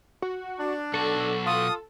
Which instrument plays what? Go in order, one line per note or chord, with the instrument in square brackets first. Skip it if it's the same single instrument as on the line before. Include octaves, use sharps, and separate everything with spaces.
[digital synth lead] F#4
[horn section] D4
[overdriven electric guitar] B1 F#4 [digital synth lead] A4
[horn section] F4 [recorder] D#6